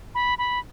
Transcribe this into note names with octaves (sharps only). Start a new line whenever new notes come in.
B5
B5